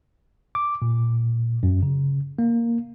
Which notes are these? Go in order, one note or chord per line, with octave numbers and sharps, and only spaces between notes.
D6
A#2
F#2
C#3
A#3